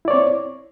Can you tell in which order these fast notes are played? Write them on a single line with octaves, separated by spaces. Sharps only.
E4 D5 C#5 C4